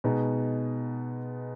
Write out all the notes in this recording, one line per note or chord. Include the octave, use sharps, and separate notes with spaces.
B2 G#3 B3 D#4